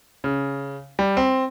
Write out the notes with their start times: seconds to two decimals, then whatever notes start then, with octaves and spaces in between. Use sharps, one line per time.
0.24 C#3
0.99 G3
1.17 C4